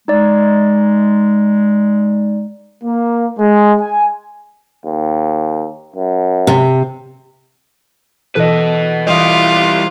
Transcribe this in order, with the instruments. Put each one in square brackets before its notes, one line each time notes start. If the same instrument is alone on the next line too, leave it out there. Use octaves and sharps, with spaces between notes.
[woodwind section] G#3 [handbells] D#4 D5
[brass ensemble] A#3
G#3
G#5
[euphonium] D#2
F#2
[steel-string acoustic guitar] C3
[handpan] B2 E3 A4 [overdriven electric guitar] B4 D#5
[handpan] E3 D#5 [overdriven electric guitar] G3 E4 [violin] F4